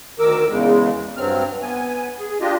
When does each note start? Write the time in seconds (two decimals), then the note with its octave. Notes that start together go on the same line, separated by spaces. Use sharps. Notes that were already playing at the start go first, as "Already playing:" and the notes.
0.19 D2 D#3 A#4 D6 E6
0.48 E2 C#3 G#3
1.16 G2 F#3 C4 F6
1.62 B3 G#5
2.20 G#4
2.41 D4 F4 G4 D#5